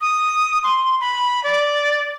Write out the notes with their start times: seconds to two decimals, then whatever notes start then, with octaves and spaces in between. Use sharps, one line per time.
0.01 D#6
0.63 C6
1.01 B5
1.44 D5